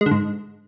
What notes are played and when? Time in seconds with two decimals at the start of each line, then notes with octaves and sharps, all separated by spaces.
0.01 G#3
0.06 D3
0.11 G#2